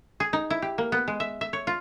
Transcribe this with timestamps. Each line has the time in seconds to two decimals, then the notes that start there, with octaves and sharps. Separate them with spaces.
0.20 G#4
0.33 D#4
0.50 E4
0.62 G4
0.78 A#3
0.92 B3
1.08 G#3
1.20 E5
1.41 E5
1.53 C#5
1.67 F4